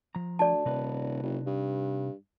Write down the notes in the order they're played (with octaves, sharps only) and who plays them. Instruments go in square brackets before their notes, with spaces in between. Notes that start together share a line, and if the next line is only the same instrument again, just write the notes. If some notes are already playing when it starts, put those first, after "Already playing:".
[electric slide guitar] F3 A#5
[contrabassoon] D2 [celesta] D5 A5
[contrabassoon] D#1 [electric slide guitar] C3 D#4 B4
[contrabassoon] F#1
G2